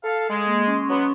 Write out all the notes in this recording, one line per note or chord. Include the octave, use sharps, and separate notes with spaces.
A4 F5
G#3
A#3
C#4 C6 C#6
F#3 B3